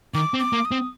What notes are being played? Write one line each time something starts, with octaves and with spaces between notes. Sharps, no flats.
D#3 D6
C4
D6
A#3
D#6
C4